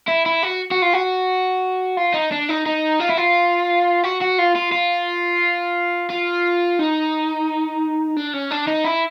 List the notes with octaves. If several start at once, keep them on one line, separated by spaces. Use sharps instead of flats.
E4
E4
F#4
F#4
F4
F#4
F4
D#4
D4
D#4
D#4
F4
E4
F4
F#4
F#4
F4
F4
F4
F4
D#4
D4
C#4
D4
D#4
E4